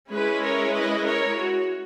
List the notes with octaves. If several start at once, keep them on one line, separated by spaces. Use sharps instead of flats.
G#3 C#4 E4 G#4 B4
A#4 C#5
B4 D#5
A#4 C#5
F#4